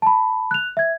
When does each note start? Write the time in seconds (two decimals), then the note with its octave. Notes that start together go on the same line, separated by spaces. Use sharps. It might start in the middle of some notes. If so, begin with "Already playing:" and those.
0.02 A5 B5
0.51 F#6 F7
0.77 E5 G#6